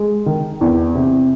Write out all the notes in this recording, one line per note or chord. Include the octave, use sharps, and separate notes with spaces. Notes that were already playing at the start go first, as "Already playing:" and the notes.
Already playing: G#3
D#3
E2
C3